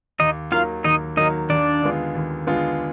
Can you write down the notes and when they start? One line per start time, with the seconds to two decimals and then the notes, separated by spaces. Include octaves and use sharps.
0.19 D#2 D#4 D#5
0.52 D#3 F#3 A#3 F4 F5
0.84 D#2 D#4 D#5
1.17 D#3 F#3 A#3 D#4 D#5
1.50 D#2 D4 D5
1.82 D3 G#3 B3 F4
2.15 D#2
2.47 D3 G#3 B3 F4